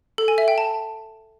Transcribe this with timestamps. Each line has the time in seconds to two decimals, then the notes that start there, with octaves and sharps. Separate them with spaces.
0.18 A4
0.28 G#5
0.38 E5
0.48 G5
0.58 A5